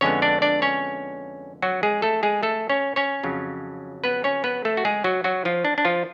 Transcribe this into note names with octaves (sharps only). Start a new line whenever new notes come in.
F2 D3 G#3 B3 C#4 C#5
D4 D5
D4 D5
C#4 C#5
F#3 F#4
G#3 G#4
A3 A4
G#3 G#4
A3 A4
C#4 C#5
C#4 C#5
F2 C#3 F#3
B3 B4
C#4 C#5
B3 B4
A3 A4
F#4
G#3 G#4
F#3 F#4
F#3 F#4
F3 F4
D4
D4
F3 F4